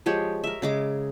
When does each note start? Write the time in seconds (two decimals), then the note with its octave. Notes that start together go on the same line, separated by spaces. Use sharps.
0.06 F3 G#3 G4 C#5
0.44 A#4 E5
0.62 C#3 G#3 D6